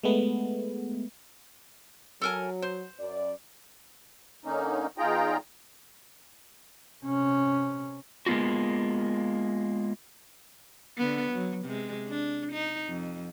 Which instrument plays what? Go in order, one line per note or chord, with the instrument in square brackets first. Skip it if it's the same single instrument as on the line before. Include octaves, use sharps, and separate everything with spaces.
[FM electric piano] G#3 A3 B3
[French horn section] F#3 [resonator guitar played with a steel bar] A4 A#4 G#5
[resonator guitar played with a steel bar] C5
[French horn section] F#2 D5
[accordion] D3 A#3 C#4 D#4
E2 D#4 F4 G#4 G5 A#5
[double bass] C3 C#4
[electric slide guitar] G#3 A#3 B3 F4 F#4
[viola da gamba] D3 B3
F#3
C3 G#3
D4
D#4
F2